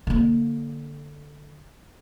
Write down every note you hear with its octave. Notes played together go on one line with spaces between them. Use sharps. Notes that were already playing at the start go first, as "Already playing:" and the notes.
D3 A#3